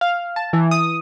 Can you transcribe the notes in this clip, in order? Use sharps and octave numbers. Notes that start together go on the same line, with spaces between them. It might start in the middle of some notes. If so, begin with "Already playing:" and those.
F5
A5
E3
D#6